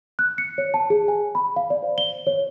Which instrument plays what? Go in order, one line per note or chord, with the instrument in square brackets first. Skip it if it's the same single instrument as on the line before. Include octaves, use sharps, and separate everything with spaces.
[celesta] F#6
C#7
C#5
A5
G#4
G#5
B5
F5
D5
C5
G7
C#5